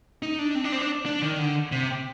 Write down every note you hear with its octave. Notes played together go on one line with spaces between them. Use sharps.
D#4
D4
C4
D4
C4
D4
D4
D#3
D3
C3